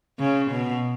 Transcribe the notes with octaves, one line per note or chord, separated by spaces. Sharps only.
C#3
B2